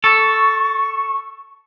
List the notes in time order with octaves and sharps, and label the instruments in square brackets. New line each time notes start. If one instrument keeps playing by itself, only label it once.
[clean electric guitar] A4 [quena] C#6